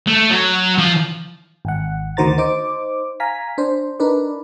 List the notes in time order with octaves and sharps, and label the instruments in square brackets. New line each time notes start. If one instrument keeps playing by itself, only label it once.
[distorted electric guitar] A3
F#3
F3
[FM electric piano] G#1 F#5
D2 D#3 F#4 C5 A#5 A6
D#4 C5 D6
F5 G#5 A#5 B6
D4 C5
D4 D#4 A#4 B4 D5